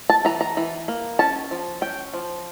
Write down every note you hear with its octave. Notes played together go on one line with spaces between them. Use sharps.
A5
E3 A#5
A#5
E3
A#3
C#4 A5
F3
C#4 G5
F3